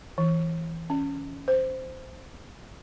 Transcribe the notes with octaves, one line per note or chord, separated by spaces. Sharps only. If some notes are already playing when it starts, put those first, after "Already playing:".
E3
C#4
C5